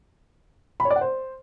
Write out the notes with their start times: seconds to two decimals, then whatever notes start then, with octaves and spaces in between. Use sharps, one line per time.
0.80 B5
0.85 C#5
0.90 D5
0.96 F#5
1.01 C5